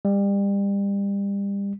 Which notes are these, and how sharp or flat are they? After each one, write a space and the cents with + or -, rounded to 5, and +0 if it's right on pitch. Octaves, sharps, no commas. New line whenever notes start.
G3 +30